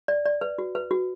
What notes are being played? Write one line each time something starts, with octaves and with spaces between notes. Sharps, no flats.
D5
D5
B4
F#4
B4
F#4